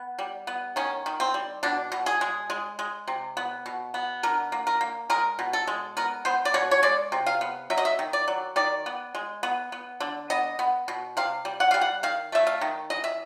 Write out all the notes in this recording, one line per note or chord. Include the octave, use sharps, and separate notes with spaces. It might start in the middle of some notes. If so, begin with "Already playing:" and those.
Already playing: B3
G3
B3
D#3 C#4
D#3
C4
G3
B2 D4
B2
G#4
G#3
G#3
G#3
C3
B3
B2
B3
D3 A#4
A#3
A#4
A#3
G#3 A#4
B2
A4
G#3
B3 A#4
B3 C5
D5
B2 C#5
C#5
G#3 D5
C3
F5
B3
F#3 E5
D#5
E5
D#3
D5
F#3
D#3 D5
B3
G#3
B3
B3
D3
B3 D#5
B3
B2
C3 F5
G3
F#5
G3 F5
F#5
D#3 F5
A3 E5
F5
D#3
E3 D#5
E5